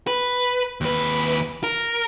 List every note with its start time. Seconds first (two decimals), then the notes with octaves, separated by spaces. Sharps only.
0.07 B4
0.81 D#2 B4
1.64 A#4